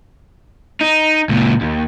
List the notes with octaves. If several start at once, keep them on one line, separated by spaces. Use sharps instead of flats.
D#4
C#2 A#2
D#2